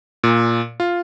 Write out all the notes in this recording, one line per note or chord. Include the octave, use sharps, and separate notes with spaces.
A#2
F4